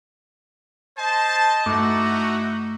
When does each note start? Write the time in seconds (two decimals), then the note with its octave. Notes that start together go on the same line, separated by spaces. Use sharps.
0.98 C5 D#5 A5
1.66 G2 A3 D#4 E4 F#4 D6